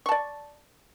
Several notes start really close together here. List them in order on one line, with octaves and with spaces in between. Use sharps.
C#6 A5 D5